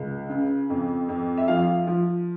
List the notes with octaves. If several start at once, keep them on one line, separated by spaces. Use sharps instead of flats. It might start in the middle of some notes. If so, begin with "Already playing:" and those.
Already playing: C#2
C#3
F2
F2
E5
F3 F5
F3